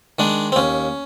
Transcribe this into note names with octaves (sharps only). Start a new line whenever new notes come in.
D#3 G#3 D4
C4
D#2 C#4